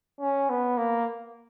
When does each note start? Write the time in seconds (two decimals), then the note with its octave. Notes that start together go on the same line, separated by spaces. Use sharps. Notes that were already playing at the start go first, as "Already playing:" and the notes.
0.20 C#4
0.50 B3
0.78 A#3